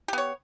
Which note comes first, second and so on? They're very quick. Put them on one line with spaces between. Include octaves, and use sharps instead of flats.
G4 B3 C#5